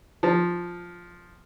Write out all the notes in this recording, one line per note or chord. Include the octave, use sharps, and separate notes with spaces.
F3